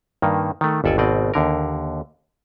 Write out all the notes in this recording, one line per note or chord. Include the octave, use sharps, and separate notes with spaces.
G2 D#3 A#3
D#3 A3
G1 D#2 A4 D5 G#5
G#1 B2 C4 D5 D#5
D#2 D3 A#4